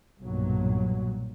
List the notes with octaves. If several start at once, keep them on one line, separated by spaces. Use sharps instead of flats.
B1 G2 A#2 F#3